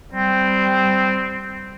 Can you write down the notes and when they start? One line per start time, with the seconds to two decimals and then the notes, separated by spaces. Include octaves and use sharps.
0.13 G3 C4